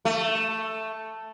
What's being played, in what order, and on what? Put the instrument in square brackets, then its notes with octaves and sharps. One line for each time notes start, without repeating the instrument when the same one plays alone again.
[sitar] A3